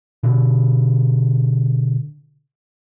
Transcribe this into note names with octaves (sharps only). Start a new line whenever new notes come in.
B2 D3